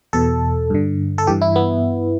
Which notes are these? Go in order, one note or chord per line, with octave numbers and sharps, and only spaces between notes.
E2 B2 A4
G2 D3
A4
G2 E3 G4
E4
B3